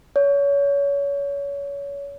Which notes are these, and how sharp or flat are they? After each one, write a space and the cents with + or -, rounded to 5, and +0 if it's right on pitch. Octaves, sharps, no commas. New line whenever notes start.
C#5 +30